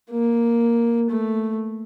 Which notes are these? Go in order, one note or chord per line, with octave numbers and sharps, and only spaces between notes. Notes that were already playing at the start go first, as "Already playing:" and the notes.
A#3
A3